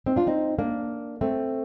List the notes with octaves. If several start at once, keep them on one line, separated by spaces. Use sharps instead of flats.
C4 D#4
D4 F4
C4 D#4
A#3 D4
A3 C4